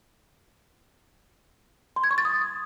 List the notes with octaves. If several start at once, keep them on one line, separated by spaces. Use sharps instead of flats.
C6
G#6
C#6
A6
D#6